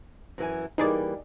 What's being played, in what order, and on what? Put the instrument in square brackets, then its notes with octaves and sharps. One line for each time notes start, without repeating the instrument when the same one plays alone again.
[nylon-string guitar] F#2 E3 G#5
[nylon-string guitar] E3 G3 A#3 [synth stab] D#4 G#4 D5